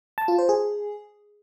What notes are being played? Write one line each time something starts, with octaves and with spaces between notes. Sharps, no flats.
A5
F4
C5
G#4